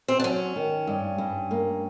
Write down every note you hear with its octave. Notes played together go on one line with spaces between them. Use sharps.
C4
D4
F#3 C#4
D#3
G2
G2
A#3